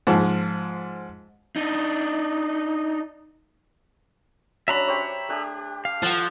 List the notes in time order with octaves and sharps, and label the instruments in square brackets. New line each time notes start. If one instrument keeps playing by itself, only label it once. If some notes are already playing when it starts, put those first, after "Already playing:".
[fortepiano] G#2 F3
[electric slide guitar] D4 D#4
[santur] F#3 C#4 D4 [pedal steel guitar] E5 A#5 B5
[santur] G4 C5 C#5
A3 D4 G4
[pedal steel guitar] F5
[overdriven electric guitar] F3 [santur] A4 F#5